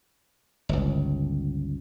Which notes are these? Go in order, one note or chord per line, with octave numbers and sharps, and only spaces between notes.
G1 C#2